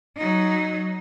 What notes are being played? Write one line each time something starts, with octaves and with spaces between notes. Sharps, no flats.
F#3 D#4